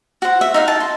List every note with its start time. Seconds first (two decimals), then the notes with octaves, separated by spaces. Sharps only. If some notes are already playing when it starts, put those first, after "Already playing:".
0.22 F#4 C5
0.41 E5
0.54 D#4 E5 F5
0.68 A5
0.80 C6